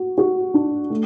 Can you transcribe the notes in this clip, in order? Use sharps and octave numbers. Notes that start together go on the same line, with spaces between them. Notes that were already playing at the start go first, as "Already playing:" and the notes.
Already playing: F#4
F#4
D4
A3